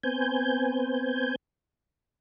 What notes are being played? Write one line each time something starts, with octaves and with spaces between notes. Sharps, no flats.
B3 C4 G#5 G6